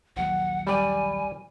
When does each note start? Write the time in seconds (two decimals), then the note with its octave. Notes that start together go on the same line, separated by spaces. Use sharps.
0.16 A#1 D#2 F#3 F#5
0.67 G3 D5 G#5 B5